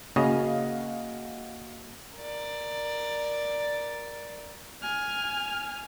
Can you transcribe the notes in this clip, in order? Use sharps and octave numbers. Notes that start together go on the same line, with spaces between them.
C#3 A#3 F#4 G#4 D#5 F5
A#4 D5
G#5 F6